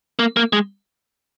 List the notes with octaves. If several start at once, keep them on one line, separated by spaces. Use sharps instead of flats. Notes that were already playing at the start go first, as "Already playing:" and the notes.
A#3
A#3
G#3